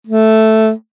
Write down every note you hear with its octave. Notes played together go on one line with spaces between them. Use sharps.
A3